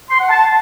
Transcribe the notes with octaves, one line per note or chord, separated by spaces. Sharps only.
C6
F#5
A5